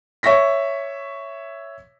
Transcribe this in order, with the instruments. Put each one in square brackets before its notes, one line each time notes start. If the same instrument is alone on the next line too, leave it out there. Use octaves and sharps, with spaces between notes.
[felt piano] C#5 E5 C#6 A#6 B6